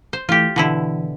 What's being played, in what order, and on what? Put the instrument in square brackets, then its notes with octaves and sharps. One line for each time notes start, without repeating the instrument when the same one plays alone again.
[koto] C5
[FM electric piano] E3 A3 [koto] F4 G4
[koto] B2 D3 E4 [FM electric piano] E3